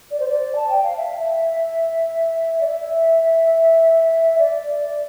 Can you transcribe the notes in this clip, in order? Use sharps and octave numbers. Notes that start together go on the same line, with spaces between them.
D5
C5
D5
A5
G5
F5
E5
D5
E5
D5